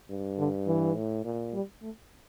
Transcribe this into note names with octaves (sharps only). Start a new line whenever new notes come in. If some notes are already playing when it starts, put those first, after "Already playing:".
G2
D3
E3
A2
A#2
G3
A3